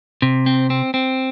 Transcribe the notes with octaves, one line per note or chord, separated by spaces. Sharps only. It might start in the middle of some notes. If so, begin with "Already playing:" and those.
C3
C4
C4
C4